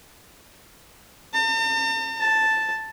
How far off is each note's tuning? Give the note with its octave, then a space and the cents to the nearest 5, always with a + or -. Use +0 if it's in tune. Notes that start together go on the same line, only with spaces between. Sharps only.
A5 +45
A5 +0